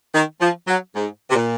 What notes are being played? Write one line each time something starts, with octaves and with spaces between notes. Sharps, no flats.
D#3
F3
F#3
G#2
C3
A#2